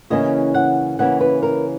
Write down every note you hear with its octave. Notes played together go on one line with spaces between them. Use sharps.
C#3 E3 A#3 C#4 E4 D#5
F#5
C#3 E3 A#3 C#4 E4 F#5
B4
A#4